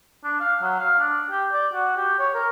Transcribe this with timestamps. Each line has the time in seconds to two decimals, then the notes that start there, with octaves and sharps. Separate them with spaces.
0.24 D4
0.40 F5
0.62 F#3
0.79 F5
0.99 D4
1.31 G4
1.52 D5
1.73 F#4
1.96 G4
2.19 C#5
2.34 A#4